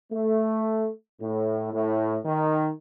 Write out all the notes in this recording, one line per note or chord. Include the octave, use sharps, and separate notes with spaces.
A3
A2
A2
D#3